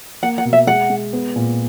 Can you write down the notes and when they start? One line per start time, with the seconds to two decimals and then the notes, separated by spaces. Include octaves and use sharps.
0.23 A#3 F#5
0.38 F#5
0.45 B2
0.53 E5
0.67 G#3 F#5
0.90 G#3
1.13 B3
1.36 A#2